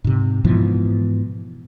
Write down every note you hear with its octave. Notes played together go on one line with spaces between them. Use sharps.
G#2 C3
G#2 B2 E3 F3